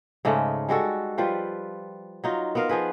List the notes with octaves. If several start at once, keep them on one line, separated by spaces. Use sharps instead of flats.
G#2 C#3 G#3 A3
G3 G#3 F#4 A4
F3 G3 F4 B4
F#3 D#4 F4
B3 F4 A#4 F5
F3 B3 G#4 B4